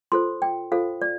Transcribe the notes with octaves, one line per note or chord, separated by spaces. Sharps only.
F4 A4 C5 C6
G5
F4 A4 C5 F5
D5